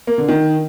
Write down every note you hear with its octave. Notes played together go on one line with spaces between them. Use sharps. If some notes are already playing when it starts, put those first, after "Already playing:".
A#3
D3
D#3